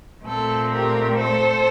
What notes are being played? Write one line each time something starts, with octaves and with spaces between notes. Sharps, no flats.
A#2 A3 C4 A4
G4 A#4
A4 C5